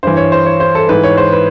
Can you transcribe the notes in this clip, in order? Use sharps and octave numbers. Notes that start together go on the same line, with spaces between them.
G2 E3 C5
C#5
C5
C#5
C5
A4
G#2 E3 B4
C#5
C5
B4